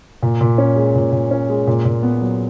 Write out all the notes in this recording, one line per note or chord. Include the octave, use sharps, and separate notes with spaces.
A#2
A#2
C#4
G#3
A#2
A#2
C#4
G#3
A#2
A#2
B3
F#3